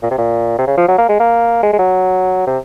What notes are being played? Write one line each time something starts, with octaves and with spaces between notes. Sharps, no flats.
A#2
C3
A#2
C3
C#3
F3
F#3
A#3
G#3
A#3
G#3
G#3
F#3
C3